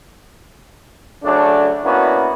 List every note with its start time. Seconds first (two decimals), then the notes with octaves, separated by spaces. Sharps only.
1.24 C#3 F#3 A3 D4
1.84 A#3 B3 C#4 D4 E4 F#4